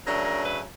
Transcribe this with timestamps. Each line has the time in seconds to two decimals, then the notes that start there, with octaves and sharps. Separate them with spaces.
0.06 C#3 F#3 A3 D4 A#4
0.25 A#4
0.45 B4